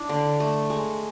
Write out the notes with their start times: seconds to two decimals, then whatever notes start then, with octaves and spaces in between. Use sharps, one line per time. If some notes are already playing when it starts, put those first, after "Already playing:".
Already playing: D4 E4
0.09 D3
0.40 A3
0.70 G#3